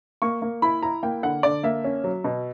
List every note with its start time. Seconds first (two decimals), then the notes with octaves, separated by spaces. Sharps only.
0.22 A#3 C#6
0.42 A#3
0.62 E4 B5
0.82 E4 A#5
1.03 A#3 G5
1.23 D3 F#5
1.43 D3 D5
1.63 A#3 E5
1.84 C#4
2.04 F#3
2.24 B2